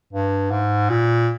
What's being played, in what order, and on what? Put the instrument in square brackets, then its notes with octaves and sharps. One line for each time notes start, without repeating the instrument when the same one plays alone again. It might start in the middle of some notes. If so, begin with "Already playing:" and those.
[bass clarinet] G2
G#2
A#2